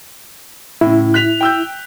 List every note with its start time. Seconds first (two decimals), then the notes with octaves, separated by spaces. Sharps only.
0.81 A2 C#3 E4
1.14 F#6 B6 F7
1.41 G5 E6 G6